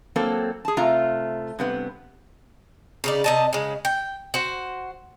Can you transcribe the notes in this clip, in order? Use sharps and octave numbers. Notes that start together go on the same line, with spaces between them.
F#3 A#3 C4 A4
G#4 A5
C3 A3 F4 A#5
G2 C3 B3
C#3 D#4 D5
C3 D#5 A5
C#3 G#3
G5
F#4 C5